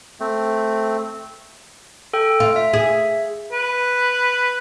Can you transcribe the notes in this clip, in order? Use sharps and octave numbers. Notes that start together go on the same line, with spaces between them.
A3 C4
A4 G5
F4
E5
G#4
B4